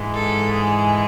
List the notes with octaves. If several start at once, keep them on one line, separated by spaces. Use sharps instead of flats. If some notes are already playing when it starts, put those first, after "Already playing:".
Already playing: G#2 E3 G#3
A4
G#4